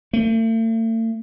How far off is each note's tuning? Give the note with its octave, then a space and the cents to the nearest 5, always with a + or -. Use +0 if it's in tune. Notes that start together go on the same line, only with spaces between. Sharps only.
A3 +40